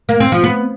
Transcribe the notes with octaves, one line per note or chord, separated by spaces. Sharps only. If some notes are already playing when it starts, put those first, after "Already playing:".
A#3
C4
F3
B3